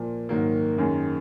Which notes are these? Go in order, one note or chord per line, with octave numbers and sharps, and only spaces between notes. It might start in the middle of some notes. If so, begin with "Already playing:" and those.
Already playing: A#2 F3 A#3
G#2 D#3 F#3 A#3
F#2 D#3 G#3